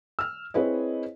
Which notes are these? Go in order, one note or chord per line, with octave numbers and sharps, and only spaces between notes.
E6 F6
C4 E4 G#4 B4 C#5 D#5